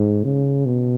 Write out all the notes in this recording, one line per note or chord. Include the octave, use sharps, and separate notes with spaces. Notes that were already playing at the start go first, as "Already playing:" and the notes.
Already playing: G#2
C#3
B2